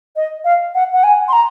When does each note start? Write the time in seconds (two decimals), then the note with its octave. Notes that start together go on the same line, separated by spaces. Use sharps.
0.16 D#5
0.44 F5
0.74 F#5
0.92 F#5
1.03 G#5
1.28 C6
1.32 A#5